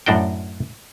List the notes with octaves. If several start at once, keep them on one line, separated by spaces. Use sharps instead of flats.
F#2 A2 D4 F#4 G5